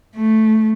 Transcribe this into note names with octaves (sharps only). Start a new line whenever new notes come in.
A3